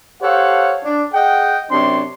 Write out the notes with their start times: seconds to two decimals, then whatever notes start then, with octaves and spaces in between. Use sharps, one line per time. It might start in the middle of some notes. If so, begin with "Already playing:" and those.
0.22 G4 A4 C5 C#5 F5 F#5
0.84 D4
1.13 G#4 D#5 F#5 G5
1.71 F#2 C3 C4 D4 C#5 C6